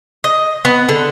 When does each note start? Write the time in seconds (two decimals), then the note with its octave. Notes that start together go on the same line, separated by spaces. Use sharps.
0.24 D#5
0.65 B3
0.89 D3